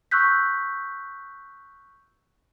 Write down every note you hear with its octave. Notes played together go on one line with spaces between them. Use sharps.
C#6 E6 F#6 G6 B6